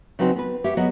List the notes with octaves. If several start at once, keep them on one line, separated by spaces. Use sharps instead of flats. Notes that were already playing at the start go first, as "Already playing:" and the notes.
C#3 F#3 B3 C4 D#4
B3 B4
G4 C#5 E5 F#5
F#3 B3 G#4 D#5